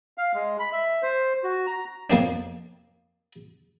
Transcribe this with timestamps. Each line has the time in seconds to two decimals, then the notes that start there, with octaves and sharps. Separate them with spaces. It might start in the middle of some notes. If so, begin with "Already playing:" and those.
0.18 F5
0.34 G#3
0.59 B5
0.72 E5
1.03 C5
1.44 F#4
1.67 A#5
2.10 F2 A#3 C4 D4